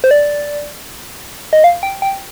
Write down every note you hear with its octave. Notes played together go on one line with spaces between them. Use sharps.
C5
D5
D#5
F5
G5
G5